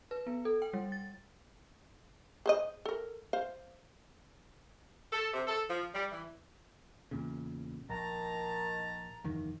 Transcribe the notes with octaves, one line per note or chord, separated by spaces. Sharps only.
B4
B3
A4
G5
G3
A6
G#4 C5 D#5
A4 A#4
C5 F5
A4
C3
A4
F3
G3
E3
E2 A#2 C#3
A#1 D#3 A5 A#5
F#1 E2 D#3